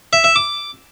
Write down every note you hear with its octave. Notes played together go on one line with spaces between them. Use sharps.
E5
E5
D6